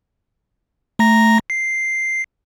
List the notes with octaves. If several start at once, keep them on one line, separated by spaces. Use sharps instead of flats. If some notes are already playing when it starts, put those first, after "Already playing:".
A3 A#5 A#6
C7